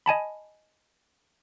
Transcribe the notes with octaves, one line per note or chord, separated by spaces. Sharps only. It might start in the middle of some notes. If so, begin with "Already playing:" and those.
D#5 G#5 A5 B5